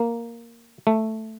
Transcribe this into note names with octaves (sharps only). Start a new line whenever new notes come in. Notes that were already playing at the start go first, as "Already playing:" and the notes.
Already playing: A#3
A3